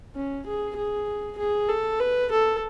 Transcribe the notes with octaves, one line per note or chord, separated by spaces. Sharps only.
C#4
G#4
G#4
G#4
A4
B4
A4